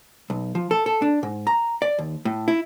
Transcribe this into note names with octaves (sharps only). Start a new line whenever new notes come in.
B1
F3
A4
A4
D4
G#2
A#5
D5
D#2
A2
E4